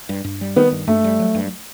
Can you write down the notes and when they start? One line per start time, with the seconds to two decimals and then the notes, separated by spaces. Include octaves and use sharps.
0.09 G2
0.24 G2
0.41 G3
0.56 D#3 B3
0.72 G2
0.87 G2 A3
1.04 G3
1.20 F#3
1.35 G2